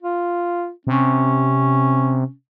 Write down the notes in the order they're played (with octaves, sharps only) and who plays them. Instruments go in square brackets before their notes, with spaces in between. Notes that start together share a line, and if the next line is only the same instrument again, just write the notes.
[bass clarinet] F4
[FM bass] C3 [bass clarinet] C#4